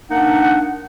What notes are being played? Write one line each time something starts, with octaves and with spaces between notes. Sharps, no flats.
A#3 D4 D#4 F#5